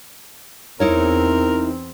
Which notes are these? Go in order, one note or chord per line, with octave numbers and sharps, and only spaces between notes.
E2 C4 D#4 E4 A#4 C#5